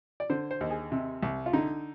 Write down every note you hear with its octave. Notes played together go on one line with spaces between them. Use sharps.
D5
D3 C5
C5
D#2
G#4
C3
C2
F4
D3 D#4